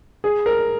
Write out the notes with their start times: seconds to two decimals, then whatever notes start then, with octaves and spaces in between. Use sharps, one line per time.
0.24 G#4
0.46 A#4